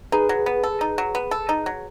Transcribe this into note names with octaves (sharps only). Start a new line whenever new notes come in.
D#4 G#4 B4
F#3
B3
A4
D#4
F#3
B3
A4
D#4
F#3